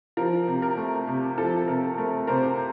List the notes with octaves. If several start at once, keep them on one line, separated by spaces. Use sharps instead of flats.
F3 A#4
C3
A#4
A3
C3
F3 A4
C3 A#4
A3 A#4
C3 A#4 C5